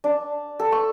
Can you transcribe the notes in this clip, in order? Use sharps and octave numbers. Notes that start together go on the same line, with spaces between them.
D4
A4
C#6